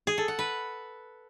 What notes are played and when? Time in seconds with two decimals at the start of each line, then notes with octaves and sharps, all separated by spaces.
0.07 G#4
0.18 A4
0.28 F#5
0.39 B4